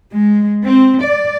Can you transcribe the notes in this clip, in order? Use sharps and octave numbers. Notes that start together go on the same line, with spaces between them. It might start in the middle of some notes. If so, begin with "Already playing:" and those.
G#3
C4
D5